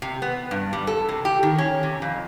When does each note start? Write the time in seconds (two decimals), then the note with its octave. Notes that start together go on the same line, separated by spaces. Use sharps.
0.02 C3
0.22 B3
0.51 G2
0.73 G3
0.87 A4
1.09 C3
1.25 G4
1.43 D#3
1.58 C#4
1.83 C3
2.02 F2